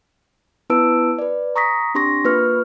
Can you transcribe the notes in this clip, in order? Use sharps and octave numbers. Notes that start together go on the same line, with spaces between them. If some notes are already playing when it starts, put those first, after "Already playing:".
B3 E4 B4 A5 E6 D7
B4 D5
A#5 C#6 D#6 A#6 B6
C4 D4 G4 C6 C#6 A#6
A#3 F4 B4 C#6 F6